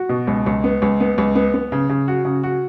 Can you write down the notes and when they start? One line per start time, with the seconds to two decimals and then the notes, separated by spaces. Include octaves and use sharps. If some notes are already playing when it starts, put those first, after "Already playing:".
Already playing: F#4
0.09 B2
0.27 C#2
0.46 C#2
0.64 B3
0.82 C#2
1.00 B3
1.18 C#2
1.35 B3
1.54 B3
1.72 C#3
1.89 C#3
2.08 F#4
2.25 C#3
2.43 F#4